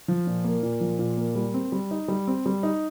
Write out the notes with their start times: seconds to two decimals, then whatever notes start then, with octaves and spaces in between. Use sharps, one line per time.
0.08 F3
0.27 A#2
0.44 A#3
0.63 A#2
0.81 F3
0.99 A#2
1.17 A#3
1.35 G3
1.54 C4
1.72 G3
1.91 D#4
2.08 G3
2.27 C4
2.46 G3
2.63 D#4